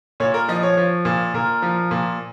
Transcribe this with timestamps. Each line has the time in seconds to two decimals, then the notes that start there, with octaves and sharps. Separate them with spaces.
0.20 A#2 C#5
0.34 A#4
0.48 F3 D#5
0.63 C#5
0.77 F3
1.05 A#2
1.34 A#2 A#4
1.62 F3
1.91 A#2